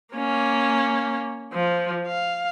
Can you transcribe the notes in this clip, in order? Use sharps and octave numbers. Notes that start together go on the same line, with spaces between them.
A#3 C#4
F3
F5